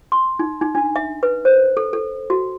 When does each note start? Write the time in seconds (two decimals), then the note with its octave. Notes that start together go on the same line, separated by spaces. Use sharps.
0.12 C6
0.39 D#4
0.61 D#4
0.75 D4
0.96 E5
1.23 B4
1.45 C5
1.77 A4
1.93 A4
2.30 F#4